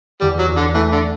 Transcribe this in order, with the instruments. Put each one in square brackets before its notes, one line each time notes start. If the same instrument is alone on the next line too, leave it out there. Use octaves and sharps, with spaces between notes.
[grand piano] E2 [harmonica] G3
[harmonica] F#3
[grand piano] E2
[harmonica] D3
[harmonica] E3 [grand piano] A3
[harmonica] D3